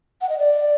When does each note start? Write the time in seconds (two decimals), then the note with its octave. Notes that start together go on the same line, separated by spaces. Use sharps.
0.21 F#5
0.29 D#5
0.38 D5